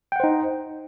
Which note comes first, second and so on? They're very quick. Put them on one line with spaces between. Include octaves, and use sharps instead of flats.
G5 F#5 C5 D#4